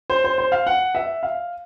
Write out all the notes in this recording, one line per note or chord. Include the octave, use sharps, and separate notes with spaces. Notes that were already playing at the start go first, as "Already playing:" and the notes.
C5
C5
C5
F5
F#5
E5
F5